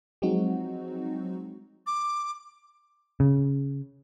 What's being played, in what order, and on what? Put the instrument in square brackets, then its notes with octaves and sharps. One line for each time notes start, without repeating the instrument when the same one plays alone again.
[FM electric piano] F3 F#3 G#3 C4 D#4 F#4
[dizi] D6
[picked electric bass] C#3